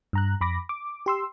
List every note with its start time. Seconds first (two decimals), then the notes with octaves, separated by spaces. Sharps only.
0.13 G2 A#5 F#6
0.41 F2 B5 D6 A#6
0.69 D6
1.06 G4 C6 E6